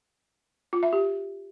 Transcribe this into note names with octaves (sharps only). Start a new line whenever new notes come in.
F4
E5
G4